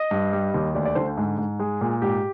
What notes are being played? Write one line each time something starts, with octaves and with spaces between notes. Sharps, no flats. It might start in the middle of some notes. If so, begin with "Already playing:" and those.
Already playing: D#5
G2
G3
D#2
D2 D5
D5
D3 C5
G#2
G#2
G#3
A#2
G#2 G4